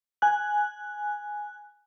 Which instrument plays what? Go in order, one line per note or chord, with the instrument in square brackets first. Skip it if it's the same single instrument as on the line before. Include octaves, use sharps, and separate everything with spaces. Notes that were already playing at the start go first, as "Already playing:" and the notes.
[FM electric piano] G#5 F#6